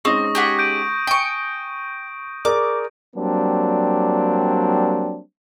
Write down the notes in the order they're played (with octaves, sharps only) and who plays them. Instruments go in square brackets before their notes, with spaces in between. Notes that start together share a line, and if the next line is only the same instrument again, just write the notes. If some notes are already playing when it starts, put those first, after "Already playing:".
[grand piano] G#3 C#4 D#4 [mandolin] C4 [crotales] C#6 D#6 A#6
[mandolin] G4 G#4 F#5
[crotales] G6 D7 D#7
[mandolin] G5 C#6 [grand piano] G#5
[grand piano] G#4 A#4 D5 [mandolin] D6
[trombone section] F#3 G3 A#3 C4 D4